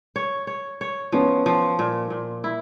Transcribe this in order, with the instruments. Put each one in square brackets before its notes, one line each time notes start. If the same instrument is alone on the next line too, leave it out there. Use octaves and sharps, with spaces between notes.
[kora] C#5
C#5
C#5
[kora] F3 [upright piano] B3 C#4
[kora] F3
A#2
A#2
E4